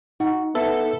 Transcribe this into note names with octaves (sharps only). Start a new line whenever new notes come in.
D#4 F#4
B3 E4 A4 A5 B5